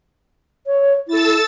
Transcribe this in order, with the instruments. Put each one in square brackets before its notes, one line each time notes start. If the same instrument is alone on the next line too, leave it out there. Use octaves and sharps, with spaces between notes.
[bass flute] C#5
[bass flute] E4 [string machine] A4 E6 A6